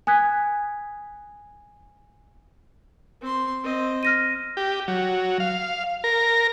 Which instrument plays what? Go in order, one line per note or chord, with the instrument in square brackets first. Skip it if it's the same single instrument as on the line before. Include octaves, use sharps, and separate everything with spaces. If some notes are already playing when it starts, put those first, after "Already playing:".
[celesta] G#5 D#6 F#6 G#6 B6
[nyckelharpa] C4 C6
C4 D#5
[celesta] F6 A#6 D#7
[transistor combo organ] G4
F#3
F5
A#4